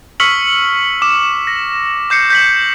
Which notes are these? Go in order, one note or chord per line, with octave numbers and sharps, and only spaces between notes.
C#6 E6 F6 B6 C#7 F#7
D6 E7
A#6
D6 G6 C7 C#7
G6 B6 F#7